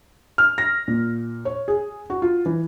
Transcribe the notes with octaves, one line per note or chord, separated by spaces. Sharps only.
F6
A#6
A#2
C#5
G#4
F#4
F4
E3